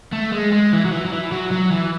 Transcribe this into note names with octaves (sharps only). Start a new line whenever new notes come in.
A3
G#3
G#3
E3
F#3
E3
F#3
E3
F#3
F#3
E3